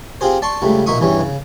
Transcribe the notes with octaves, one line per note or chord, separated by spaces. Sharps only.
C4 F4 G4 G#4 C5
D5 A5 C6 C#6
C#2 C#3 G3 A3
B1 A#2 D#4 E5 C#6 D#6
E2 G2 E3 G3 C#4
C#3